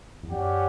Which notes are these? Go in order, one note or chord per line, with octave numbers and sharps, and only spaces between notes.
E2
F#2 C#4 G4 D5 F#5